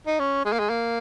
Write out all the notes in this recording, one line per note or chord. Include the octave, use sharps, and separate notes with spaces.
D#4
C#4
G#3
A#3
G#3
A#3